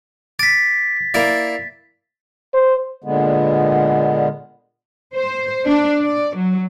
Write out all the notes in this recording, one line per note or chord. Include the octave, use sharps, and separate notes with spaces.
D6 A6 B6
A#3 E4 D5
C5
A#2 D3 G#3 B3
C5
D4
D5
F#3